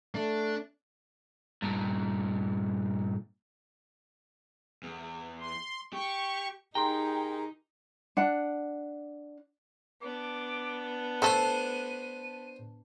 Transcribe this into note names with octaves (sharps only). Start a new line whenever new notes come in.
A3 D4
G2 A#2
E2
C6
G4 C#6
D#4 G4 G#4 A#4 G5 A#5 C6
D4 F#5
B3 D4 D6
A3 A4 C5 C6 D#7